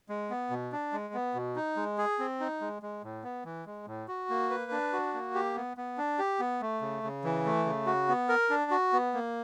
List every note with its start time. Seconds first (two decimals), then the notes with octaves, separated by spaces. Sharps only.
0.09 G#3
0.30 B3
0.50 B2
0.72 D4
0.93 G#3
1.14 B3
1.34 B2
1.56 D#4
1.76 G#3
1.98 G#4
2.19 C4
2.40 D#4
2.61 G#3
2.82 G#3
3.04 A2
3.24 B3
3.45 E3
3.66 G#3
3.87 A2
4.08 F#4
4.30 A#3
4.50 B4
4.71 D4
4.93 F#4
5.14 A#3
5.34 G4
5.56 B3
5.77 B3
5.98 D4
6.19 G4
6.39 B3
6.61 A3
6.81 C#3
7.03 C#3
7.24 E3
7.45 A3
7.65 C#3
7.86 F#4
8.08 B3
8.29 A#4
8.50 D4
8.71 F#4
8.93 B3
9.14 A#3